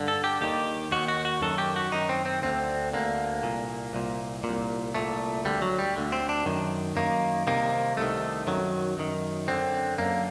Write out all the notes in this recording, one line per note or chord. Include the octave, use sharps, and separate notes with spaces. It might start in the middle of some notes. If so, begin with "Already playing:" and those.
Already playing: G2 D3
A4
G4
D#2 D#3 G4
D#2 D#3 F#4
F#4
F#4
F#2 D#3 A4
G4
F#4
F#2 D#3 D#4
C4
C4
D2 D3 C4
D2 D3 A#3
C2 A#2
C2 A#2
A#2
C2
C2 A#2 A3
D2 D3 G3
F#3
G3
D2 D3
C4
D4
F#2 D#3
F#2 D#3 A#3
C2 C3 D#3 A#3
C2 C3 D#3 A3
F#2 D#3 F#3
F#2 D#3
F#2 D3 C4
F#2 D3 A#3